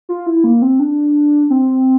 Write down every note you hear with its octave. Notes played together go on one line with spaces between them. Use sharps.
F4
E4
A#3
C4
D4
C4